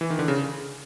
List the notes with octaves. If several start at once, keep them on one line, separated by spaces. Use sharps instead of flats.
E3
D#3
D3
C#3